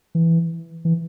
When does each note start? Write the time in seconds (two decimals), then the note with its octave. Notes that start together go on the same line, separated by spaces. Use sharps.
0.15 E3
0.85 E3